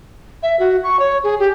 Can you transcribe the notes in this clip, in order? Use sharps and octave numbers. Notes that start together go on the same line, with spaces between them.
E5
F#4
C#6
C#5
G#4
G4